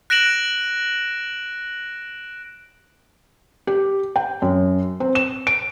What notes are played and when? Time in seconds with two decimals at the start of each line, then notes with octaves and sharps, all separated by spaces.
0.10 F#6 A#6 D7 E7 F#7
3.67 G4
4.16 G5
4.42 F#2
5.00 C4
5.15 E7
5.47 D7